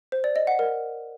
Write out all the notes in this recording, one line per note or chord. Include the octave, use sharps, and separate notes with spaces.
C5
D5
D#5
F#5
A#4